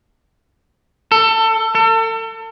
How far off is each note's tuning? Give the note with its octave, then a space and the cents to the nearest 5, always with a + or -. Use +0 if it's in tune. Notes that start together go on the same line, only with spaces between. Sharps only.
A4 +25
A4 +35